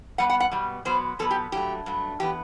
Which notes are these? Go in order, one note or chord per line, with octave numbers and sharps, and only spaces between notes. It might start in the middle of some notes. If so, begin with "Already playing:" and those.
B2 G3 B3 F#5
F#5
F#5
B2 G3 B3
B2 F#3 B3 C5
B2 F#3 B3 A4
G4
G2 F#3 A3 G4
G2 F#3 A3
E3 B3 G4